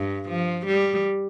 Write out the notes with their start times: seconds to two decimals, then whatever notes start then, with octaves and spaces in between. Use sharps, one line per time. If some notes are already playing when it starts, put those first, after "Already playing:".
Already playing: G2
0.29 F3
0.66 G3